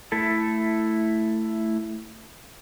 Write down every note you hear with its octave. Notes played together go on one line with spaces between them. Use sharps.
A3 E4 A4